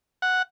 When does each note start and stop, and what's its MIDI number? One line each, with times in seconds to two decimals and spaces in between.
0.22 0.42 78